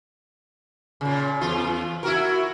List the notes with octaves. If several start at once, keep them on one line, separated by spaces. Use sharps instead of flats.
A#2 C#3
E2 F4
E4 F#4 A#4